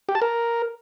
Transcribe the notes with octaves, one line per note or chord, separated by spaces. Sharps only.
G4
A5
A#4